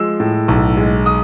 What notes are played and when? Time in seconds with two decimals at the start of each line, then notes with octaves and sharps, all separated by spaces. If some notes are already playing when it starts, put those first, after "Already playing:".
Already playing: F3 G#3 E6
0.20 A2
0.48 B1
0.77 G#3
1.06 D#6